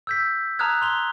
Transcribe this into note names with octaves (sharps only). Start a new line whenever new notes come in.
E6 G6 B6
A5 A#5 D#6 F6 F#6 G#6
C6 F7 G7